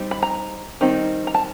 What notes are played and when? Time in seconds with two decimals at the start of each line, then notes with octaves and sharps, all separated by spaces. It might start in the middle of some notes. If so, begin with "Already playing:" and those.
Already playing: G3 C4 D#4
0.11 B5
0.23 A#5
0.81 D#3 G3 C4 D#4
1.27 A#5
1.34 A5